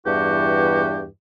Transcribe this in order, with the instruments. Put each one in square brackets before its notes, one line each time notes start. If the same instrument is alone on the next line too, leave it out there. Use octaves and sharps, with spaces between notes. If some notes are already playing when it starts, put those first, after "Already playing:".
[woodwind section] E2 G2 E3 F#4 G4